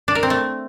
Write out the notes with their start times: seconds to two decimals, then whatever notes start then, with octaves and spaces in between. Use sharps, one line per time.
0.08 D4
0.15 A#4
0.23 C4
0.30 A3